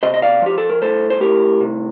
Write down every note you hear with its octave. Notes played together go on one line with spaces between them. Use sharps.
C3 C5 D#5
D#5
D5 F5
F3 G4
A4
A#4
A2 A4 C5
C5
A2 G4 A#4
C3